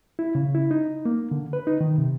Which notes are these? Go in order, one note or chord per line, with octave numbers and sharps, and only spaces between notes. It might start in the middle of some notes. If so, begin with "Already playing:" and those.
E4
C#3
E4
D#4
A#3
D3
B4
D#4
D#3
C3